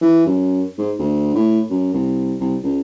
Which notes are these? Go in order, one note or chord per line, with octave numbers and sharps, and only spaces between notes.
E3
F#2
G#2
D2
A2
F#2
C2
C2
C#2